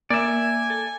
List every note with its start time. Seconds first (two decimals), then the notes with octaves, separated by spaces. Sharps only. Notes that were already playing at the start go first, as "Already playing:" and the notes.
0.10 A#3 D5 E5 G#5
0.70 A4